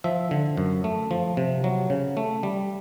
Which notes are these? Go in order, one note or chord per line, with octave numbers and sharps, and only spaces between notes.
F3 E5
D3
F#2
A3
F3
C3
F#3
C#3
A3
G3